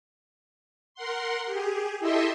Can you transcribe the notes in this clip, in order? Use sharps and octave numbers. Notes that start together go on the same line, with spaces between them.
A#4 F#5 C6
G4 G#4
E4 G4 A4 D#5 E5 C6